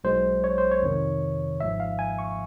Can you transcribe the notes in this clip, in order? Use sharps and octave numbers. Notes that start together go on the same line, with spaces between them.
B1 B2 G#3 C5
C#5
C5
C#5
F2 C3 D#3
G#1 G#2 F3 E5
F5
G#5
C#6